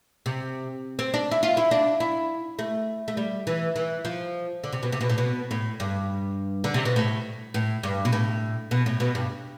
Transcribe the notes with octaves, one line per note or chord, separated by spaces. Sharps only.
C3
C4
D4
E4
F4
E4
D4
E4
A3
A3
G3
E3
E3
F3
D3
C3
B2
C3
B2
A2
B2
A2
G2
D3
C3
B2
A2
A2
G2
B2
A2
B2
A2
B2
G2